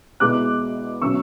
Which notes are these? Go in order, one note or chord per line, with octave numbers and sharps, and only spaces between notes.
B2 G#3 B3 E4 D6 F#6
B2 F#3 C#4 C#6 E6